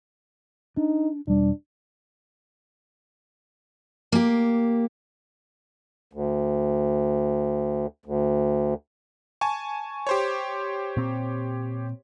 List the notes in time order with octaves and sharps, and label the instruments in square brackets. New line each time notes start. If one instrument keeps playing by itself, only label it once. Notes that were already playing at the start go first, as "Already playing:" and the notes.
[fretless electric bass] D4 [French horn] D#4
[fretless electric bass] E1 G3 [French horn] D4
[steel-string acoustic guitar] A#3 G4
[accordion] D2
D2
[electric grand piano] G#5 A5 C#6
G4 C5 C#5
[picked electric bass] A#2 C4